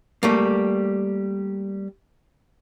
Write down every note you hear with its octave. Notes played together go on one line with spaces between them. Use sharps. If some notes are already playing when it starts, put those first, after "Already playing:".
G3 A3 A#3